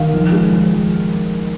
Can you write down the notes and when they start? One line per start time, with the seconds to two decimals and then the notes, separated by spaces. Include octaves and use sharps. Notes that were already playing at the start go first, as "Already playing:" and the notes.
Already playing: D#3 F5
0.14 F3
0.32 G#3
0.52 F3
0.73 F3